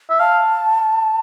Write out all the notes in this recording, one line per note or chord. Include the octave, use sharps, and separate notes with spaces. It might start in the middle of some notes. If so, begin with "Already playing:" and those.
E5
F5 A5